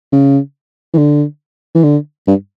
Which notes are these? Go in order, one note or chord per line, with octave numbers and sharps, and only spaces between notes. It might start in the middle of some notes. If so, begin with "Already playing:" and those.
C#3
E3
D3
E3
D3
G2